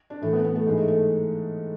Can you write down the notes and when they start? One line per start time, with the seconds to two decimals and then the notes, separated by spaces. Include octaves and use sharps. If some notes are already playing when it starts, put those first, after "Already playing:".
0.10 D4
0.22 A2 E3 A3
0.33 B3
0.44 B3
0.56 A3
0.67 G#2 E3 G#3
0.77 A3
0.88 A3